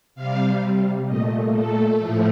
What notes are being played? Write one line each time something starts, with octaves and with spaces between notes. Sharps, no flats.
C3 G3 F5
A#2 A3 D#5
A4
A2 F3 A3